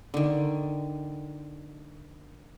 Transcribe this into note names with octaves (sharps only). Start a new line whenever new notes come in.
D3 D#3